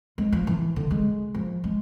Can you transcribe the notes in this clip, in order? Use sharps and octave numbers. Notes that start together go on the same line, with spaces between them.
G#3
F3
E3
D3
G#3
F3
G#3